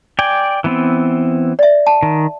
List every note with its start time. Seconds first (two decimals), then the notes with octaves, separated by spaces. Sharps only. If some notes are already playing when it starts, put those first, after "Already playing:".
0.19 D5 G5 G#5
0.64 E3 B3 C4
1.59 D5 E5
1.87 A5
2.03 D#3